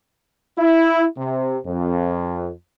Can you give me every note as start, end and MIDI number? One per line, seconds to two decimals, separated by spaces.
0.58 1.05 64
1.16 1.58 48
1.65 2.50 41